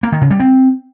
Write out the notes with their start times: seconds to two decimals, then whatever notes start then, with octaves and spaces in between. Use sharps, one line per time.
0.03 A#3
0.12 D#3
0.21 C#3
0.31 G3
0.40 C4